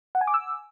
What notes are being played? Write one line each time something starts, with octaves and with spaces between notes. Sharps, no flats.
F#5
G#5
D6
E6